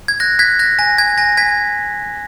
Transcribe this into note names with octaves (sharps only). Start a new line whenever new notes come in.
G#6
F#6 A#6
F#6 G#6 B6
F#6 A#6
G#5 A#6
G#5 G#6
G#5 A#6
G#5 G#6 B6